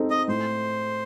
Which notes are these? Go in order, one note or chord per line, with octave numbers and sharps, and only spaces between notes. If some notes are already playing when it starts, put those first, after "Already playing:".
Already playing: C4 D#4 A4
D#5
A2 C5